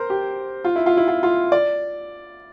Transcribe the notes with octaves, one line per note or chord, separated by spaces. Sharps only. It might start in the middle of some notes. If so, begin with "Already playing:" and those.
Already playing: A#4 C5
G4
F4
E4
F4
E4
F4
F4
D5